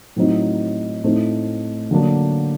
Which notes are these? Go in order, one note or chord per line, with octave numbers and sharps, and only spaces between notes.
A2 F#3 C4 D#4
A2 A3 C4 D#4
D3 F#3 A#3 D4